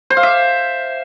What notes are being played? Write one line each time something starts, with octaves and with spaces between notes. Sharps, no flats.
C5
F5
E5